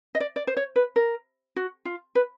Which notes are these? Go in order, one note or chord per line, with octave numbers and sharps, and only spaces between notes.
D#5
D5
D5
C5
C#5
B4
A#4
F#4
F4
B4